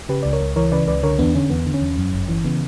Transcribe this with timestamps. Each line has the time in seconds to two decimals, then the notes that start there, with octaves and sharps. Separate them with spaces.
0.09 C#3 G4 B4
0.23 C#2 D5
0.33 A#4 C#5
0.41 C#2
0.56 E3 A#4 C#5
0.72 C#3 B4 D5
0.87 C#2 B4 D5
1.03 D3 A#4 C#5
1.19 E2 B3 D4
1.35 D3 C#4
1.50 E2 B3
1.66 D3
1.74 C#4
1.81 E2
1.97 F#2
2.13 G1
2.28 E3
2.44 C#3 B3